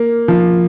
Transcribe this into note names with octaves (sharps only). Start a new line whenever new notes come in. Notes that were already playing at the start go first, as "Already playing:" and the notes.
Already playing: A#3
F3